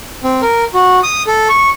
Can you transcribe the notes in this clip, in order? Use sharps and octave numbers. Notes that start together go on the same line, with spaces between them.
C4
A#4
F#4
D#6
A4
C#6